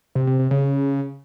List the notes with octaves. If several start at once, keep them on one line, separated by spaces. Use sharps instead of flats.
C3
C3
C3
C#3